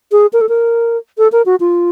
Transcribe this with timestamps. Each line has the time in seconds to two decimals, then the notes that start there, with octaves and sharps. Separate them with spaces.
0.12 G#4
0.33 A#4
0.41 A4
0.49 A#4
1.18 A4
1.32 A#4
1.46 F#4
1.60 F4